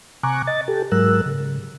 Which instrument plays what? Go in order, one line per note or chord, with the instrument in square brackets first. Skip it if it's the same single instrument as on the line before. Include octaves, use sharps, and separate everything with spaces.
[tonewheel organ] C3 G#5 A#5 C#6 D6 F#6
D#5 A6
G4 A4
G#2 F#3 G#3 A#4 E6 F#6
C#3